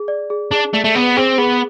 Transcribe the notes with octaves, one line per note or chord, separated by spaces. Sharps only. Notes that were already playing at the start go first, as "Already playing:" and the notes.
Already playing: G#4
D5
G#4
D4 G#4
A3 D5
A3
B3 G#4
C4 G#4
B3 G#4